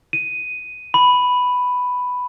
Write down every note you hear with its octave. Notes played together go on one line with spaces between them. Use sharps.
D#7
B5